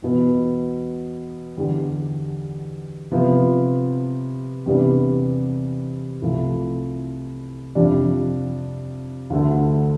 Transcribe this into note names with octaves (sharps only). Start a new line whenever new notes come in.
E2 B2 B3
E2 D3 G3 D4 G4
C3 F3 B3
E2 C3 G3 B3 D4
C2 C3 F3 A3 E4
F2 C3 G3 D4
D2 D3 A3